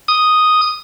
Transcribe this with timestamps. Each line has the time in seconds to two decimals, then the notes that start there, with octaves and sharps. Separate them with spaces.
0.08 D#6